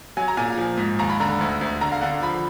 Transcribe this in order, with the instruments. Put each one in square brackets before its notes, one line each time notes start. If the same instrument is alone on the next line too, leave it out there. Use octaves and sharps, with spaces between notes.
[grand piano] F#3 G#5
A#5
A#2 G#5
F3
G#2
D#2 A#5
B5
D3 A#5
D2
D2
D3 A#5
F5
D3 F#5
F3 B5